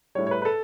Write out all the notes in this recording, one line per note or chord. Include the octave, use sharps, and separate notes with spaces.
A2 G3 C#5
C#5
B4
B4
A4